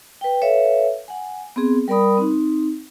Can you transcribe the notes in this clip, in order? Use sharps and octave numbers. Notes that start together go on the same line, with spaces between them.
B4 G5
A4 B4 C#5 E5 F5
F#5 G#5
B3 C4 G#4
G3 A#4 D5 B5 D#6
C4 D#4